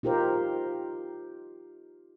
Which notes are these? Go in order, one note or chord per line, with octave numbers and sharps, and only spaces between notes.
D#4 F4 G4 A#4 C5